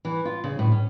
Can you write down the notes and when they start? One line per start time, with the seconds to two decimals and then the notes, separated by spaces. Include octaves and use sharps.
0.05 E3
0.25 F4
0.44 C#3
0.59 A2
0.72 C#4